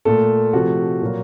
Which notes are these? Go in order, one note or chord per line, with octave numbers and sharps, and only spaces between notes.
A#2 A3 A4
C3 F3 A3 F#4
A#2 F#3 A#3